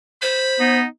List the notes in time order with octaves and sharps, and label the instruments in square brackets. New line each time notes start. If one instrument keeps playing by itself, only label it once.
[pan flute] C5 [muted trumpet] B5
[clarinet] B3 [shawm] D#4